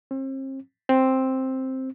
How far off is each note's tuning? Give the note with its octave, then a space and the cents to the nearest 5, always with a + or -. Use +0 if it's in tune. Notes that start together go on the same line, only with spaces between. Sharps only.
C4 +40
C4 +5